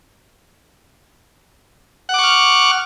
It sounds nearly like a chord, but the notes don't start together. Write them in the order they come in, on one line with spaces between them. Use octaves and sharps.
F#5 D6 C#6 F6